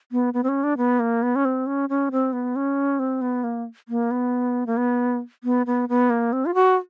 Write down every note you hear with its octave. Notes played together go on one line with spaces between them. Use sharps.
B3
B3
C4
C#4
D4
B3
A#3
B3
C#4
C4
C#4
C#4
C4
B3
C#4
C4
B3
A#3
A#3
B3
A#3
B3
B3
B3
B3
A#3
C4
F4
F#4